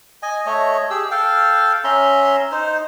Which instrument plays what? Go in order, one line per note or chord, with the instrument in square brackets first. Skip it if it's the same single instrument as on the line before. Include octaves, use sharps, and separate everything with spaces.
[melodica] D#5 G#5
A3 C#5 D#5
G4 G#4 E6
A4 F5 G5
C#4 E5 A#5 C6
D#4 C5